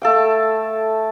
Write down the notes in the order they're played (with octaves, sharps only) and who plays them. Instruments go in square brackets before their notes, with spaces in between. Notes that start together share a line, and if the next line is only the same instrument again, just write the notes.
[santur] A3 A4 F5 G5